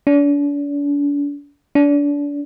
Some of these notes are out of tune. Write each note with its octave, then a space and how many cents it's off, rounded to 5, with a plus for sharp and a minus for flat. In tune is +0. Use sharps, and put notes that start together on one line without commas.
D4 -40
D4 -30